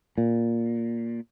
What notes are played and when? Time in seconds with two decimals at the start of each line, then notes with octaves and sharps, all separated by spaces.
0.18 A#2